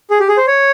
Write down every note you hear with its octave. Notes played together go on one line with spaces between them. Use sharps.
G#4
G4
G#4
C5
C#5